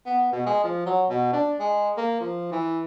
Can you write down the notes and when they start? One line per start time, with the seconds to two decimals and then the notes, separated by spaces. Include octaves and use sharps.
0.06 B3
0.33 B2
0.47 G#3
0.64 F3
0.87 F#3
1.10 B2
1.33 D4
1.60 G#3
1.98 A#3
2.20 F3
2.52 E3